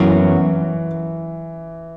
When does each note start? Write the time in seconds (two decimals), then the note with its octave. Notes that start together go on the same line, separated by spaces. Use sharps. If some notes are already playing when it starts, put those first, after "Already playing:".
Already playing: F#2 E3 F#3 B3 F#4